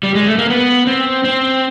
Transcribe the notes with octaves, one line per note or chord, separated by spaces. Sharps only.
G3
G#3
A3
A#3
B3
C4
C4